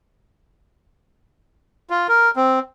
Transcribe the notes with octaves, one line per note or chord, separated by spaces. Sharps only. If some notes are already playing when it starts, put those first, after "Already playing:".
F4
A#4
C4